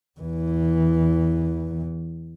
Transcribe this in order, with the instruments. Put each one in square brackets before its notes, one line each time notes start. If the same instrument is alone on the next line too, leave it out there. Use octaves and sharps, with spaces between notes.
[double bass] E2 E3